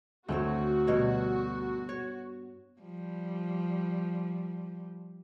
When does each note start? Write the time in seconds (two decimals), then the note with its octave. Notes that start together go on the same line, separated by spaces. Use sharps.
0.28 D2 A3 C4 F#4 C#5
0.87 G2 B2 C#5
1.89 C#5
2.80 F3 G3